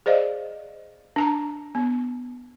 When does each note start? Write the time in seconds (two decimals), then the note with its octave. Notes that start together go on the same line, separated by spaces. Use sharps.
0.06 G#4 C5 D5 D#5 F5
1.16 D4 A5 A#5
1.75 B3